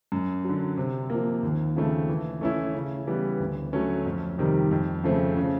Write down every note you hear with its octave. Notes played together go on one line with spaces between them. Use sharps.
F#2
D3 F#3
C3
F3 A#3
D#2
C#3 F3 A3 C4
E3
A3 C#4 E4
C#3
E3 G3 B3
D2
D3 F#3 A3 C#4
F2
C3 D#3 G3
F2
C#3 F3 A3 C4
C#3